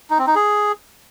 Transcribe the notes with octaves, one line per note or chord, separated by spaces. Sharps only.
D#4
C4
D#4
G#4